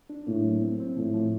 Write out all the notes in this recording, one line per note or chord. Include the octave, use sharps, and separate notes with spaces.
D4
A2 A#3
F#3
C4
C4
A2 F3
F3